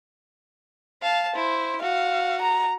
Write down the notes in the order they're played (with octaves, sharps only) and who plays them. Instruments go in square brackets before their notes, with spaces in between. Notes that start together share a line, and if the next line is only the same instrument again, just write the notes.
[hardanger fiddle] F5 A5
[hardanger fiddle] E4 [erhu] C5
[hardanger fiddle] F#4 [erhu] F5
[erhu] A#5